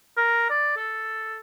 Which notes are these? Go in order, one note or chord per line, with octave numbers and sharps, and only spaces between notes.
A#4
D5
A4